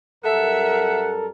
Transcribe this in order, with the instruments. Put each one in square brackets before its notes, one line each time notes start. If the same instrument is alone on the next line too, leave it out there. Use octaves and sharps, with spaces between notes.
[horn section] F#2 G3 A#4 [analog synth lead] A4 [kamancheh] E5 [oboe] F#5